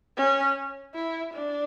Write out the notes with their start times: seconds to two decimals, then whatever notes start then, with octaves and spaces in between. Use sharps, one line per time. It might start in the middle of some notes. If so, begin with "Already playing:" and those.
0.17 C#4
0.95 E4
1.33 D4